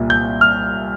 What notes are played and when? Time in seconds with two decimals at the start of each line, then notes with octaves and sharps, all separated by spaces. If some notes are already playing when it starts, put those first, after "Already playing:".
Already playing: C2 A#2
0.10 G6
0.41 F6